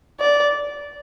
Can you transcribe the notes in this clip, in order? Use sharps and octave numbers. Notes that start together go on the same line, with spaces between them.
D5